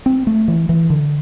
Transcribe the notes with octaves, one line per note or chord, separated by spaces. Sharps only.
C4
A3
E3
E3
D3